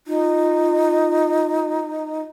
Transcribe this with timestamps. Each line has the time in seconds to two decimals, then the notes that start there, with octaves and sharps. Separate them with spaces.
0.07 D#4 F4